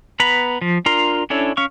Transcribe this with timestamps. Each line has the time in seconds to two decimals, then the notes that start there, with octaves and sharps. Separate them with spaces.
0.20 B3 B4 A#5 B5
0.61 F3
0.86 D4 F4 A#4 A#5 C6
1.30 C#4 D4 E4 A4 C#5
1.57 C#4 F5 C#6